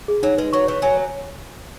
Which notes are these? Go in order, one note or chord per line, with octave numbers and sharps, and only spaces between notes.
G#4
F#3 D#4
G#3 B4
F#3 C#6
E3 C#5
F#3 G#5
C#5